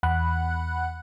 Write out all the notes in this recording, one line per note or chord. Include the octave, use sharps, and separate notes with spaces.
E2 F#5 B5 F#6